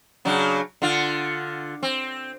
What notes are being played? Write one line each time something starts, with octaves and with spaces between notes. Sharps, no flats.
C#3 F#3 D4
D3 F4
C4